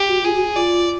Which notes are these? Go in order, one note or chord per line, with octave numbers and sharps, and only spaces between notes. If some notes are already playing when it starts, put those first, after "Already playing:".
Already playing: G4
F#4
F4 G#4
F#4
F4 D5